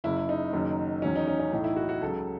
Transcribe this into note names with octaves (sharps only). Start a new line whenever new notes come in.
F#1 F#2 C#3 E4
D#4
F#1 F#2 D#3 F#3
E2 D#3 F#3 C#4
D#4
C#4
C#4
B1 A2 E3 D#4
E4
F#4
F#4
C#2 C#3 F#3 A4